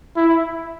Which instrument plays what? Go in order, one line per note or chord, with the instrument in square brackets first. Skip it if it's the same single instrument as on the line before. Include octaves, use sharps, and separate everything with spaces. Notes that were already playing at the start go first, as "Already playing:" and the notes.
[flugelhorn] E4